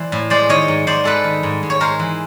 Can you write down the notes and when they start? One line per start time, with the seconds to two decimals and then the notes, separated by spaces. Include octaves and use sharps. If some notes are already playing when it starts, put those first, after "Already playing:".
Already playing: E3 C5 D5
0.12 A2
0.30 G#3 C5 D5
0.49 D#3 C#5 D#5
0.68 G#2
0.87 G#2 C5 D5
1.04 G#3 A4 B4
1.24 D#3
1.43 G#2
1.63 G#2
1.70 C#5
1.80 G#3 A#4 C5
1.99 E3